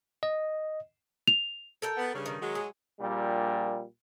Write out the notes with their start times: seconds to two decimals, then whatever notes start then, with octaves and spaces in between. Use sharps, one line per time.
0.23 D#5
1.28 F7
1.82 A4 A#4 G5
1.97 B3
2.14 G2 C#3
2.26 D#3
2.41 F#3 G#3
2.55 G#4
3.00 A#1 A#2 G3